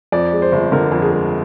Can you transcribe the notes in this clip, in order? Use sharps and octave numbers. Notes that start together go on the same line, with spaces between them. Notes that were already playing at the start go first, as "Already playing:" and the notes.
F2 D5
G#3
C5
G1
D3 A#4
F2
G#4
G#3